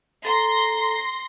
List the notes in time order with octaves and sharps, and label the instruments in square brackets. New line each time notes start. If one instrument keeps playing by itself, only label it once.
[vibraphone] A4 A#5 [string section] C6 A#6